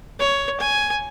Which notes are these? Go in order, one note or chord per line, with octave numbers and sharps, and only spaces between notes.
C#5
G#5